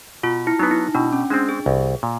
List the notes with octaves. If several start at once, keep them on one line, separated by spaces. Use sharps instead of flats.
B2 F4
E4
F#3 B3 D#4
E4
B2 D4
C#4
G#3 C4 D4
G#4
C2
A#2